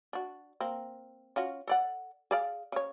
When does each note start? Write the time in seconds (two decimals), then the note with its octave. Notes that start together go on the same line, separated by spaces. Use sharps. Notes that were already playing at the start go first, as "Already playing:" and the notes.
0.13 D4 F#4
0.60 A#3 C4
1.36 C#4 F4 F#4
1.67 A4 D5 F#5
2.31 G#4 D5 F5
2.72 C#3 C#5